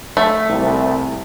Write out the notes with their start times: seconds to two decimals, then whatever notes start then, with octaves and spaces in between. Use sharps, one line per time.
0.17 A3
0.49 C2